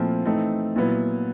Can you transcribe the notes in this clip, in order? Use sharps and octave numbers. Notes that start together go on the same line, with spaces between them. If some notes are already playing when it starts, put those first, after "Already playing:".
Already playing: A#2 F3 A3 C4 E4
E3 A3 C4 D#4
A#2 F#3 B3 E4